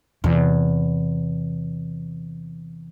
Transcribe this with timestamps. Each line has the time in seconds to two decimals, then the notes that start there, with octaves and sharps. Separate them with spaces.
0.24 E2 C3